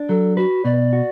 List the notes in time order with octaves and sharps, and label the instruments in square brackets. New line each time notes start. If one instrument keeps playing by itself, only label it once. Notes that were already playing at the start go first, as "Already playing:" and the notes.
Already playing: [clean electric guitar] D4
[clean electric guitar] F#3 [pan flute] A4
[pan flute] F#4 [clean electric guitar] B4
[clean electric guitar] B2 [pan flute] D5
[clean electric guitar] F#4